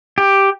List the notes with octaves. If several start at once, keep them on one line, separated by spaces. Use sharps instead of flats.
G4